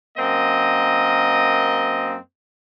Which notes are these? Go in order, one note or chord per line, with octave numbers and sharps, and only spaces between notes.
F#2 A#3 C4 D#5